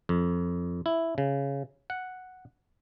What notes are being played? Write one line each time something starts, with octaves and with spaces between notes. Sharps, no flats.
F2
E4
C#3
F#5